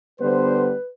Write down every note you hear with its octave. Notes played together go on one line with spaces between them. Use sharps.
D3 G3 B3 B4 C5